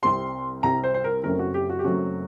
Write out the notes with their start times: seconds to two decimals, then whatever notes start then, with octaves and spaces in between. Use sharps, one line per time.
0.02 C2 C3 G3 C4 C6
0.63 C2 C3 G3 C4 A#5
0.84 C5
0.94 C5
1.04 A#4
1.24 F#1 F#2 F#3 A3 C4 A#4
1.39 F#4
1.54 G4
1.69 F#4
1.79 G4
1.84 F#1 F#2 F#3 A3 C4 F#4